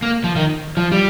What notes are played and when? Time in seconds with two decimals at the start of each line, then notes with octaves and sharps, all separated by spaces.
0.02 A#3
0.24 F3
0.36 D#3
0.77 F3
0.92 G3